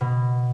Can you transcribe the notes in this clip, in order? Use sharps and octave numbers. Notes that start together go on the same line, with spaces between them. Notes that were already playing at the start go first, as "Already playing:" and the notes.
B2